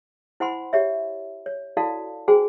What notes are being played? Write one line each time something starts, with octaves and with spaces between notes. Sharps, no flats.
E4 C5 F#5 G#5 B5 C6
G4 C#5 E5
C#5
E4 F#4 A4 D5 F5 A5
F#4 G#4 C5 G5 G#5